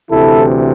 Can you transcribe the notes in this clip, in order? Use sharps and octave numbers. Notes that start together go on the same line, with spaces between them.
D2 C3 E3 E4 A4